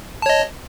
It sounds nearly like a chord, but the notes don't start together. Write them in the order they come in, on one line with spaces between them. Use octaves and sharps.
A5 C#5 D#5